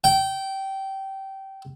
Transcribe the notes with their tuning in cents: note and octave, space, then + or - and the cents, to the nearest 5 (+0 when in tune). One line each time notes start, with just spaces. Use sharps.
G5 -20